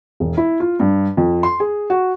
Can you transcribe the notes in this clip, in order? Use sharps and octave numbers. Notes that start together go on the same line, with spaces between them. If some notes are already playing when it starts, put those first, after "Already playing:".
E1
E4
F4
G2
F2
C6
G#4
F#4